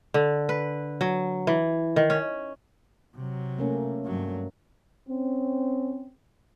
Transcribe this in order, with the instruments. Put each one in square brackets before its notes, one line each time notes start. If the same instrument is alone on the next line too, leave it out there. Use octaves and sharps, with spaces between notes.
[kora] D3
B4
F#3
E3
D#3
C#4
[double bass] C3 F#3
[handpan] A3 A#3 C#4
[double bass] G2 F#3
[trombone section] C4 C#4